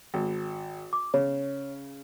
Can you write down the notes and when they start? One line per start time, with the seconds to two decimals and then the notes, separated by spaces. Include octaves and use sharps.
0.14 G#1
0.93 D6
1.14 C#3 C#5